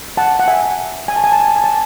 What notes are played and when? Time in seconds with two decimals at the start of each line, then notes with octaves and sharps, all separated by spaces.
0.17 F#5 A5
0.39 F#5
0.48 E5 G#5
1.08 G#5
1.16 A5
1.24 G#5
1.32 A5
1.40 G#5
1.48 A5
1.56 G#5
1.64 A5